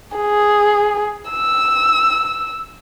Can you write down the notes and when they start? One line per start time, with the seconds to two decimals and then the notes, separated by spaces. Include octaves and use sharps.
0.16 G#4
1.30 E6